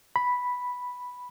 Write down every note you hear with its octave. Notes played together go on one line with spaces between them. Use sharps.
B5